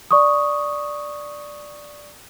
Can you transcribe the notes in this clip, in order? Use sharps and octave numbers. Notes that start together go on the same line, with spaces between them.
D5 C#6 D#6